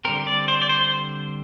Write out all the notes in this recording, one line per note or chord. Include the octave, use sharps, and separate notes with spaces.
D3 G3 C4 A#4
D5
C5
D5
C5